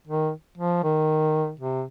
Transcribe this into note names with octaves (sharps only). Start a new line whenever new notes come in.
D#3
F3
D#3
C3